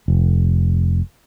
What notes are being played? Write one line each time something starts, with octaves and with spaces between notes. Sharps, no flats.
F1